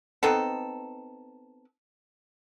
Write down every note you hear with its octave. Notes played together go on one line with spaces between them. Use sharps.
B3 C4 D#4 A4